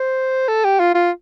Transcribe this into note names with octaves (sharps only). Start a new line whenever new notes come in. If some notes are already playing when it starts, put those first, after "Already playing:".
Already playing: C5
A4
G4
F4
F4